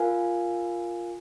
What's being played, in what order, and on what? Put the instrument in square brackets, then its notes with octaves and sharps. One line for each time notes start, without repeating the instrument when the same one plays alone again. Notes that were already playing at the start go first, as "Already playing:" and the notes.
Already playing: [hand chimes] F4 A#4 F5 G#5